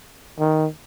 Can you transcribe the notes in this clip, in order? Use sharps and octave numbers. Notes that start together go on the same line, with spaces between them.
D#3